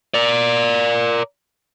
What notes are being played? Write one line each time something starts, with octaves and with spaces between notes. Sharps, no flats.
A#4 D5